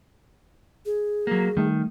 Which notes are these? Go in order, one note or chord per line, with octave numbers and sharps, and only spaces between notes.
G#4
F#3 A#3
D#3 G3 A3